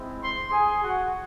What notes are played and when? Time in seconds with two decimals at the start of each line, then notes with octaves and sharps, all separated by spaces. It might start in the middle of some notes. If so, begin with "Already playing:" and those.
Already playing: G#3 C4 E4
0.21 C5 C6
0.51 G#4 G#5
0.83 F#4 F#5